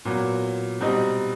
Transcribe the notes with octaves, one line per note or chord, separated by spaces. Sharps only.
A#2 F#3 B3
B2 G3 C4 D#4